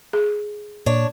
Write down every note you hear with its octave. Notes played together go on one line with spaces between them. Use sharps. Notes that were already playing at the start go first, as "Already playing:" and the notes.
G#4
A#2 D4 C#5